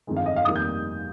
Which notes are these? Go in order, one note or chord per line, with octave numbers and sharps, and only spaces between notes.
G1 F2 D#3 G#3
F5
D#5
F5
F1 D#3 G3 A#3 D#6
G6